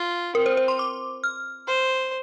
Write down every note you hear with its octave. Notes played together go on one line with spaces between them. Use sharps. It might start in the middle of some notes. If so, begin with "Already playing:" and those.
Already playing: F4
C4 A#4
C5
C5
C6
D6
F6
C5